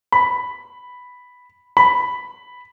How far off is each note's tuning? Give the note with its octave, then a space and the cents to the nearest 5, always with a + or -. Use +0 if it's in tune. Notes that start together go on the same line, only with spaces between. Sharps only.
B5 +0
B5 +0